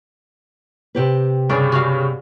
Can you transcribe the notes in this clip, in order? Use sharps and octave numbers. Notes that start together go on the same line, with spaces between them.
C3 G4 B4
G2 C#3 G#4 D5
F#4 F5